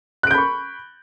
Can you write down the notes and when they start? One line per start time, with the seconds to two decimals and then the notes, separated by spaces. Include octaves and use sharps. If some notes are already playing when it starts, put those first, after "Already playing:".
0.23 F#6
0.27 D7
0.31 G6
0.34 B5
0.38 C#6